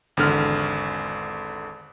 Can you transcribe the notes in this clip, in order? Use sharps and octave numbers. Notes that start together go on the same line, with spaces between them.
G#1 E2 D3 F6